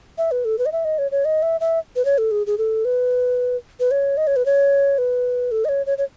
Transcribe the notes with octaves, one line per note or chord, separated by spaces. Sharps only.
E5
B4
A4
B4
D#5
E5
D#5
C#5
C#5
D#5
E5
E5
B4
C#5
A4
G#4
G#4
A4
B4
B4
C#5
D#5
C#5
B4
C#5
B4
A4
D#5
C#5
C#5
C#5